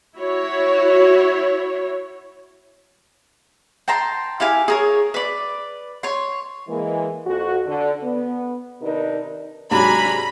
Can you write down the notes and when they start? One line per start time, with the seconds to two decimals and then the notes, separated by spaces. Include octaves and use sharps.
0.17 E4 F#4 C#5
3.88 G5 A5 A#5 C6
4.40 E4 G4 F5 G#5
4.68 G#4 A#4 C#5
5.14 B4 D5
6.03 C#5 C6
6.68 E3 G#3 A#3
7.26 F2 F#4
7.66 D3
8.03 B3
8.81 C3 D#3 D4 D#4 A#4 B4
9.71 G#2 C3 F#3 D4 G#5 A#5 B5